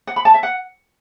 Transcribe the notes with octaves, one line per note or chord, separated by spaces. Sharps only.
F#5
B5
A5
E5
F#5